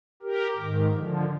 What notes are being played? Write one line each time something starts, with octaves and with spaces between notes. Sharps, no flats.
G4 A#4
G#2 D#3
D3 F3